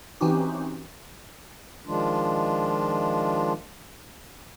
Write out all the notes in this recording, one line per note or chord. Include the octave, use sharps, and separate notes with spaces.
E3 C4 C#4 D#4 F#4 G4
D#3 F3 G#3 D4 F4